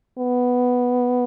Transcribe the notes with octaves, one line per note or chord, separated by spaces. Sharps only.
B3